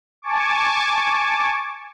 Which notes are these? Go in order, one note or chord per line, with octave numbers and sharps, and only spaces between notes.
G#5 A5 C#6 D6